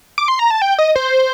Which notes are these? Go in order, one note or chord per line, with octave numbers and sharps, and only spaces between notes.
D6
C6
A#5
A5
G5
D#5
C5